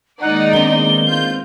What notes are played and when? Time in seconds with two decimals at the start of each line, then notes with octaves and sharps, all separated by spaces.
0.21 D#3 G#3 A#3 D#4 D5 F#5
0.53 B3 C4 D4 G7
1.06 F4 G6